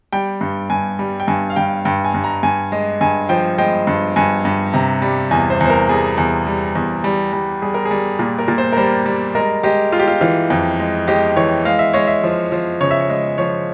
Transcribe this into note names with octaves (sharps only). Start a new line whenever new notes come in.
G3 G5
G2
G2 G#5
G3
G5
G2 G#5
F5
G2 G5
G2 G5
G#5
G2
A#5
G2 G#5
G#3
G2 G#5
F3 G5
G#3 G5
G2
G2 G#5
G2
C3 A#5
G3
E2 G#5
C5
E2 C5
A#4
G3 G#4
E2
G3
E2
G3
G3
G3 G#4
A#4
G#4
G3
A#2
A#4
A#2
C5
A#4
G3 C5
G3
G#3 A#4
G#3 G4
G#3 F4
G4
F4
E3 F4
F2
G#3
G#3 G4
E3 C#5
G#3 F5
E5
G#3 C#5
E5
F3
F3
C#3 C#5
E5
C#5
G#3
F3 C#5